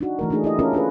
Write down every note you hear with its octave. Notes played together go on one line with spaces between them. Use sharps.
D4 D#4 F#4
E3 A3 A#4
A3 A#3 D4 D#4 G#4
E4 G4 D#5
C#4 F4 A4 A#4
D4 F4 G#4 B4